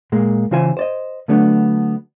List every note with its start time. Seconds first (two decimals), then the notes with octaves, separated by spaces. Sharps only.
0.12 A#2 G#3 A#3
0.51 C#3 E3 F4 C5 G#5
0.77 C5 D5 D#5
1.28 D3 F#3 A3 B3 D4